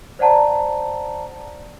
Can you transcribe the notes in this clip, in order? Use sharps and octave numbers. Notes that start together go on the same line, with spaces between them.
C5 D5 F#5 A5 A#5